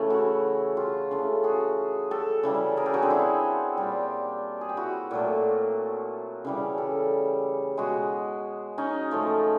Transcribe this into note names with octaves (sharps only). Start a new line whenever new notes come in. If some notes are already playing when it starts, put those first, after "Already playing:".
Already playing: C#3 E3 A3
E4 F#4
F4 G4
C#3 E3 A3
F#4 G#4
G4 A4
C#3 E3 G3
G#4 A#4
G4 A4
F#4 G#4
C4 D4
E4 F#4
A#2 G3 F4 G4
G#4
G4
E4 F#4
A#2 F#3 A3
C#3 E3 G3
G4 A4
B2 G#3 F#4 G#4
C#4 D#4
C#3 F3 A3